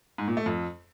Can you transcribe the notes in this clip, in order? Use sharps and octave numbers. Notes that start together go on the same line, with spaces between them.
G#2
A#2
A3
F2